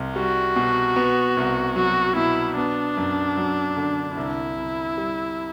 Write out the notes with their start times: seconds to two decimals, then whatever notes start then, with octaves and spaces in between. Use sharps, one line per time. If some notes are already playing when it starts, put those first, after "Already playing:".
Already playing: C2 C4
0.16 G3 F#4
0.56 B2
0.96 B3
1.37 C2
1.76 F#3 F#4
2.16 B2 E4
2.57 B3 D4
2.97 F#2
3.37 F#3
3.76 D3
4.17 C2 E4
4.57 C2
4.98 G3